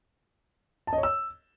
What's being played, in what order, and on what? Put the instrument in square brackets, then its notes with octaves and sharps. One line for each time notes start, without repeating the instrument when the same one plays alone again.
[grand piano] A5
D#5
C#5
E6